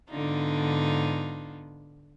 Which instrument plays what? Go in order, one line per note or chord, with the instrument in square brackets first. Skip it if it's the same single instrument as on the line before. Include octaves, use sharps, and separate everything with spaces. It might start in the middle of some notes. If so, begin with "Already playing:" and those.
[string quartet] G#2 D3 B3 D4 D#4 F4